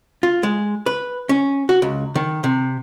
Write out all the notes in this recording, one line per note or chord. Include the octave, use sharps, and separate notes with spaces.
F4
G#3
B4
C#4
F#4
C#2
D#3
C3